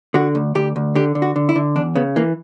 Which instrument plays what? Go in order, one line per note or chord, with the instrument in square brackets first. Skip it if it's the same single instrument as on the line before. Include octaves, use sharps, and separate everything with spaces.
[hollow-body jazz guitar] D3 F#4
D2
D2 G4
D2
D3 G4
D3
F#4
D3
E4
D3
E2 D4
C#3 B3
E3 A#3